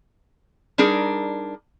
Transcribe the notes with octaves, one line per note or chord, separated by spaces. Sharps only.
G3 D4 D#4 G#4 A#4